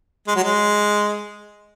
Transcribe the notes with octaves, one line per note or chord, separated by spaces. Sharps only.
G#3
F#3
G#3